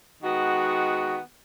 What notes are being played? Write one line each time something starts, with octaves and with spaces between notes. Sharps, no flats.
D#3 G#3 B3 F#4